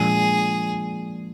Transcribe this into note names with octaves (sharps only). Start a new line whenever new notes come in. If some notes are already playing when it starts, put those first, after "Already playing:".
Already playing: A#2 F3 G#3 D4 G#4